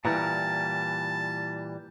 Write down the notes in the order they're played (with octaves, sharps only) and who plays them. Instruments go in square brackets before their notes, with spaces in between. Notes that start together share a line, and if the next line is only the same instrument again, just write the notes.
[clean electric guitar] A#2 E3 G3 [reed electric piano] E4 B4 [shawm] A5 [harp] A#5 F6